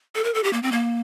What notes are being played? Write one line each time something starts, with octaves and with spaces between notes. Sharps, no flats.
A4
A#4
A4
G4
A#3
C4
A#3